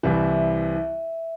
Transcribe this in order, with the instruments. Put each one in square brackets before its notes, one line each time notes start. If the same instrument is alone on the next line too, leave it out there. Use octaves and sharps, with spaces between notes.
[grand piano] C2 C3 E3 [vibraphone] E5